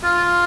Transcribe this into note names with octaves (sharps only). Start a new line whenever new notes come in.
F4